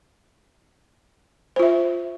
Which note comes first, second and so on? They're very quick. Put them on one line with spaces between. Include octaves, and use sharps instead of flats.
C5 F4 E5